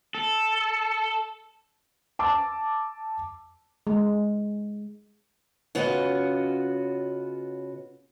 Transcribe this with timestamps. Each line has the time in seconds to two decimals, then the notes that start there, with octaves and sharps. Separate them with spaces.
0.15 A4
2.19 A5 D6 E6
3.87 G#3
5.75 C#3 B3 F4 F#4 A#4 D#5